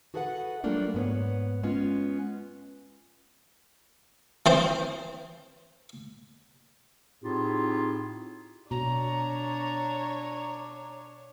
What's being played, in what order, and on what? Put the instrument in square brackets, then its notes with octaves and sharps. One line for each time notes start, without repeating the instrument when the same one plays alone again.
[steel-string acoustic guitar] F#4 G#4 A4 B4 D#5 F#5
F#3 G3 A3 A#3 D4 F4
G#2 B3 C#5
G#3 B3 C#4 F4
[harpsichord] E3 C4 C5
[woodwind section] A2 C4 D#4 F4 G4 G#4
[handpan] B2 [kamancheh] D4 C#5 [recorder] A#5